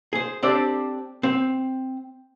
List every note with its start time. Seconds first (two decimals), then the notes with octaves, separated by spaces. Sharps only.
0.13 G#4 C5
0.43 C4 D4 G4 A4 C5 D5
1.23 C4